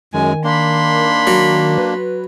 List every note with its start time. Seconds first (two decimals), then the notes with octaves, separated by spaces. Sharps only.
0.14 F#2 D#3 G#3 G#5
0.44 A#3 D4 B5 C6
1.27 F#3
1.78 B4